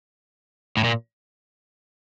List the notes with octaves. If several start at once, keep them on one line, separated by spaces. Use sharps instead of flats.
A2
A#2